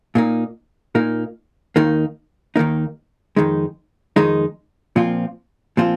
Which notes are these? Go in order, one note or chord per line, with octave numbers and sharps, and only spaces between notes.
A#2 A#3 D#4
A#2 A#3 D#4
D#2 D#3 A#3 D#4
D#2 D#3 A#3 D#4
F2 D#3 G#3 D#4
F2 D#3 G#3 D#4
A#2 F3 C4 F4
A#2 F3 C4 F4